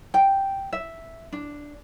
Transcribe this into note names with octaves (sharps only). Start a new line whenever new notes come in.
G5
E5
D4